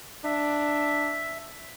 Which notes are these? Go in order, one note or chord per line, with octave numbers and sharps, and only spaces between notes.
D4 E5